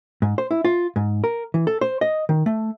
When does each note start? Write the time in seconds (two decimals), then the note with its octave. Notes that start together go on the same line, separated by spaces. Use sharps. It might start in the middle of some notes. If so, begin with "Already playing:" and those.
0.22 G#2
0.38 C5
0.51 E4
0.65 F4
0.96 G#2
1.24 A#4
1.54 E3
1.67 A4
1.81 C5
2.01 D#5
2.29 D#3
2.46 A3